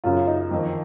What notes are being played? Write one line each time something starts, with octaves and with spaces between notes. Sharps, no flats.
F#2 C#3 F4
D#4
F2 D#3